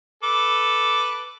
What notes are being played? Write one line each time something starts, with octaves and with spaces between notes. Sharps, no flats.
A4 B4 D6